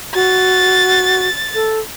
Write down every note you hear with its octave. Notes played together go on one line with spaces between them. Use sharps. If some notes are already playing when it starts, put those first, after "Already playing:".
F#4 A6
A4